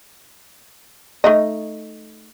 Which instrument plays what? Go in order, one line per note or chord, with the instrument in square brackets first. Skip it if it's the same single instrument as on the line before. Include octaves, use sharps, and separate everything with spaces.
[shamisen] A3 D#4 D#5